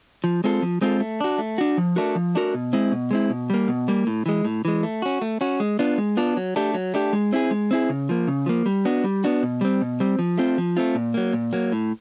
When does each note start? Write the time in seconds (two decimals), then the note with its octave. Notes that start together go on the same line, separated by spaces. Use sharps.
0.24 F3
0.44 G#3 C4 F4 A4
0.62 F3
0.81 G#3 C4 F4 A4
1.00 A3
1.21 D4 F#4
1.38 A3
1.58 D4 F#4
1.77 F3
1.96 A3 D4 F#4 A#4
2.15 F3
2.35 A3 D4 F#4 A#4
2.54 B2
2.73 G#3 C4 E4
2.92 B2
3.11 G#3 C4 E4
3.30 B2
3.50 G3 A#3
3.68 B2
3.88 G3 A#3
4.07 A2
4.26 E3 G#3
4.45 A2
4.65 E3 G#3
4.83 A3
5.02 C#4 F#4
5.22 A3
5.41 C#4 F#4
5.60 G#3
5.79 B3 D4 F4
5.98 G#3
6.17 B3 D4 F4
6.37 F#3
6.56 A3 D4 G4
6.74 F#3
6.94 A3 D4 G4
7.13 G#3
7.33 C4 E4 G#4
7.51 G#3
7.71 C4 E4 G#4
7.89 C#3
8.09 F3 A#3
8.28 C#3
8.46 F3 A#3
8.66 G3
8.85 B3 D4 F#4
9.04 G3
9.24 B3 D4 F#4
9.43 B2
9.61 G3 C4
9.81 B2
10.00 G3 C4
10.19 F3
10.38 A3 C4 F4
10.58 F3
10.77 A3 C4 F4
10.95 A#2
11.14 F#3 A#3
11.33 A#2
11.53 F#3 A#3
11.72 A2